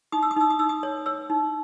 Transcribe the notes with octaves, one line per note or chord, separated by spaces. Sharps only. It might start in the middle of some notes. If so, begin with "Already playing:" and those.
D#4 D#6
E6
D#6
D#4 E6
D#6
D#4 E6
D#6
C#5
C#5 E6
D#4